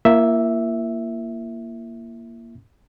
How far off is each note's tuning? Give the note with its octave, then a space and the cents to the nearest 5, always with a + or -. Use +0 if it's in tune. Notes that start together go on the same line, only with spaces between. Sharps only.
A#3 +0 E4 +45 E5 +0